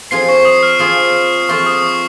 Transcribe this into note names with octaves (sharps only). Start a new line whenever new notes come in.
F3 C4 F4 G#4 C7
C#6
D#6
F6
F3 C4 F4 G#4 D#6
F3 C4 F4 G#4 C#6
D#6
C#6